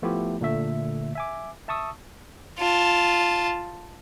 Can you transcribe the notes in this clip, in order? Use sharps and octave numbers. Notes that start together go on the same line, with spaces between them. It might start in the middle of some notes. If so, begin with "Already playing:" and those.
F3 A3 B3 E4 F4 G4
A#2 D3 A3 E5
E5 G#5 D6
E5 A5 C#6 D#6 E6
F4 A5